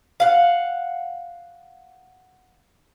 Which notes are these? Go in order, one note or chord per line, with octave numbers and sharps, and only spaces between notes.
F5 F#5